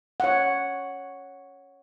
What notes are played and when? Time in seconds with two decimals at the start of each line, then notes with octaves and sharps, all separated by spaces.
0.20 C#5 F#5